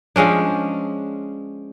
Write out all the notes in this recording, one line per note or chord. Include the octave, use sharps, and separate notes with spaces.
F3 G#3 C#4 D4